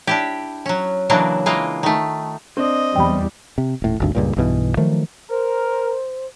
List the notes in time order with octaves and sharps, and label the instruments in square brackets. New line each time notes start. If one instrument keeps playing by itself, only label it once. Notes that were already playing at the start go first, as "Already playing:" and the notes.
[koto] D4 E4 G4
F#3 C#4
C#3 E3 F#3 A#3 D4
E3 G#3 A#3 F4
D#3 A3
[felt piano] C4 D4 [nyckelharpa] D#5
[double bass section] E2 G3 [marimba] G5 B5
[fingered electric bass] C3
D#1 A2
G#1 D2 G2
C#2 G2 A#2
B1 G2 B2 E3
D#3 F3 F#3 A3
[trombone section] A#4 [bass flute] C5